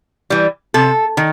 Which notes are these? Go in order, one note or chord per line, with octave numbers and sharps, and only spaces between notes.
E3 G3
C3 A4
D#3